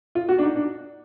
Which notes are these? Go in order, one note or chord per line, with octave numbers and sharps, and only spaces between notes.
F4
F#4
D4
D#4
D4